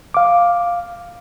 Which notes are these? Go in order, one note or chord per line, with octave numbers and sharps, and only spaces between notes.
F5 D6